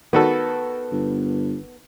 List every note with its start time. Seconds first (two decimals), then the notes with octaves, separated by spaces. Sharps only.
0.13 D#3 B3 F#4 A4
0.91 G1